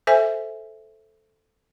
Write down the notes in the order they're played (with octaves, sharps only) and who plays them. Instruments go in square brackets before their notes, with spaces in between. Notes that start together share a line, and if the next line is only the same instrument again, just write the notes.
[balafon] A4 C5 E5 G#5